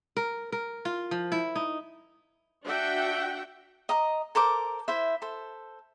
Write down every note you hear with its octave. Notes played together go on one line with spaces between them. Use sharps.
A#4
A#4
F4
F3
E4
D#4
D4 F#4 E5 F#5 G5
D#5 A#5 D#6
A4 A#4 C5 D6
E4 C5 E5
A4 C5